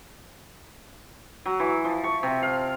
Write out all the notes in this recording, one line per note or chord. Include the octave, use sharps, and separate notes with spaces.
F#3
E3
F3
C#6
C3
F5